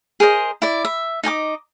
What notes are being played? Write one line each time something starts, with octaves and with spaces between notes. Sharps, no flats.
G#4 A#4 C5 D#5
E4 D5
E5
D#4 D#5 G#5 D6